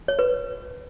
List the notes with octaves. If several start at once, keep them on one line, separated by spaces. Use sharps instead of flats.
C#5
B4